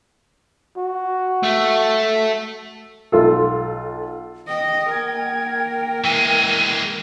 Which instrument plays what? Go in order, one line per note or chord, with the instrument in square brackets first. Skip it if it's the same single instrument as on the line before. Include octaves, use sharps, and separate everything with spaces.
[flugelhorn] F#4
[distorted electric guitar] A3
[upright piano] B1 F4 A4
[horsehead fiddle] D#5 [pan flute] G5
[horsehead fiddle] A#3 A#4 [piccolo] G#6
[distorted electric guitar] E3 G#3 [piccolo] D#7